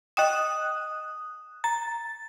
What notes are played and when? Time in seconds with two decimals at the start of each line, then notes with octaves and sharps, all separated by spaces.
0.17 D#5 G5 D#6 F#6 E7
1.64 A#5 A6